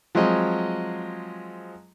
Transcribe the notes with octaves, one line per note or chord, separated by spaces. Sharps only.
F3 F#3 G#3 C4 D#5